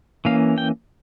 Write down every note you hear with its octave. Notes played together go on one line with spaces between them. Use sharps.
E3 A#3 C#4 F5
G5